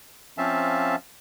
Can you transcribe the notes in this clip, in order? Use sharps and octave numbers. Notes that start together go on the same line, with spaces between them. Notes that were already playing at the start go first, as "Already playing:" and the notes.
F3 C4 C#4 E5 F5 A5